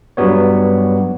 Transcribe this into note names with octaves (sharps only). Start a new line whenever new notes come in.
G2 F#3 G3 B3 C#5